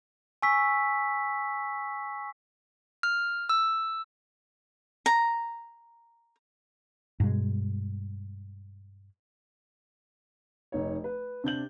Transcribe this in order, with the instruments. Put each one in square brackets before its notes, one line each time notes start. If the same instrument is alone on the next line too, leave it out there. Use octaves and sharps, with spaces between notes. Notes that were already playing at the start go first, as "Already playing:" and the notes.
[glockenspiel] G#5 C#6 E6 B6
[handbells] F6
E6
[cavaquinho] A#5
[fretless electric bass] G2 B2 G#3
[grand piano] F1 D#4 C#5
B4
C3 D4 G6 F#7